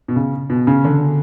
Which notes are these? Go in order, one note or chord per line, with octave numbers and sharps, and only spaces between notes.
B2
C#3
B2
C#3
D3